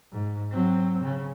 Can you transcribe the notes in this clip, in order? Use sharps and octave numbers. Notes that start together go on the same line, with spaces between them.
G#2
F#3 C4
C#3